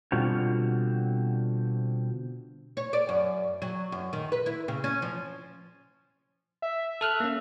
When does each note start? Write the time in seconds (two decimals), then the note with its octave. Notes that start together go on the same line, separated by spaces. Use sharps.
0.12 B2 D3 G3 C4 F4 F#4
2.77 C#5
2.93 D5
3.09 F#2
3.62 F#3
3.92 F#2
4.13 D#3
4.32 B4
4.46 E4
4.68 C#3
4.84 C#4
5.02 F3
6.62 E5
7.01 A4 F6 F#6
7.20 A#3 C#4